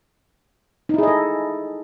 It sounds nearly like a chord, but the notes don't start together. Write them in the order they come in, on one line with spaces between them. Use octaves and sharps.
D#4 E4 G#4 D#5 A4